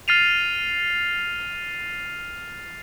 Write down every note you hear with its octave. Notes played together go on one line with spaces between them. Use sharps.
F6 A6 C7 D#7 F7